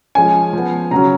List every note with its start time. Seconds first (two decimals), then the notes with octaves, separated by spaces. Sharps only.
0.15 F3 G#3 C#4 G#5
0.53 F3 B3
0.91 C#3 F#3 C#4 A#5